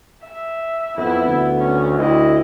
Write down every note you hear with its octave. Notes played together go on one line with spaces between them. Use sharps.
E5
F2 B3 E4
D2
C#4
D2 C4 E4 D#5